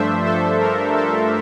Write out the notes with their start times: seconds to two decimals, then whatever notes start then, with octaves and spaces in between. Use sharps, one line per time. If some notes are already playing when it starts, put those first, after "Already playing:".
Already playing: G2 F3 A3 D4 C5 E5
0.24 A4 C5
0.60 A#4
0.96 A4